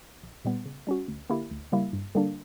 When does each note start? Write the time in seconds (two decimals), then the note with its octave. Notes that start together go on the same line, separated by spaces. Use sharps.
0.23 A#1
0.45 A#2 G3 B3
0.66 C#3
0.87 G3 C#4 F#4
1.08 D2
1.30 D3 A#3 E4 G4
1.51 D2
1.72 C#3 G3 A#3 E4
1.93 G2
2.15 D3 G3 A#3 D4